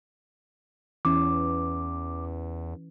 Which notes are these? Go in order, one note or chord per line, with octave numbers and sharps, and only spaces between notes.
E2 E3 C#4 D6